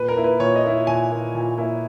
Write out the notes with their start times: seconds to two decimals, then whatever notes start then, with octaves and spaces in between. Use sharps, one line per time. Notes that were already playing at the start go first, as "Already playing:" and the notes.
Already playing: A#2 B4
0.08 A#4
0.16 A#3 E4
0.24 B4
0.39 A#2 C#5
0.56 D#5
0.64 A#3 E4
0.87 A#2 G#5
1.11 A#3 E4
1.35 A#2
1.58 A#3 E4